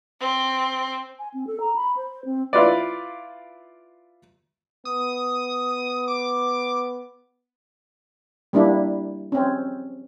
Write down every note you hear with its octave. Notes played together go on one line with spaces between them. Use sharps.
C4
G#5
C4
A4
A#5
B5
C5
C4
E4 F4 B4 D5
B3 D#6
D6
G3 A#3 D4 E4
C4 C#4